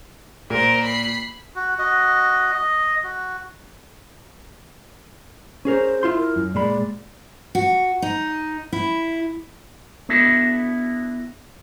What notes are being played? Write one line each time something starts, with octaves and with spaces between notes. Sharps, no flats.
A#2 A#4 C5
B5 C7
F#4
F#4 D#5
D#5
F#4
C#4 G#4 A#4 C5
E4 F4 C6
A#4
F#2
A#2 G#3 D5 B5
F#4
D#4
E4
B3 D4 E4 F#4 A4